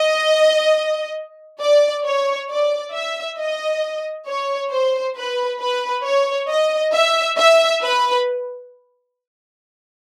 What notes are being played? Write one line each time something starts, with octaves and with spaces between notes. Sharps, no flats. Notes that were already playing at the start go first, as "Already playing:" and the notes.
Already playing: D#5
D5
C#5
D5
E5
D#5
C#5
C5
B4
B4
C#5
D#5
E5
E5
B4